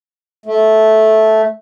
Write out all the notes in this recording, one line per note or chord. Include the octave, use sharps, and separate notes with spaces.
A3